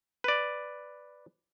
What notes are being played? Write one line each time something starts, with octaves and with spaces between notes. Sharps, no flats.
B4 D5